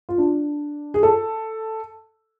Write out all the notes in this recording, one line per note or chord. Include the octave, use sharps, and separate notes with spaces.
F4
D4
G#4
A4